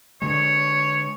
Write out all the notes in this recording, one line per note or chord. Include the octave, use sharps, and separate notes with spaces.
D3 G#3 C#5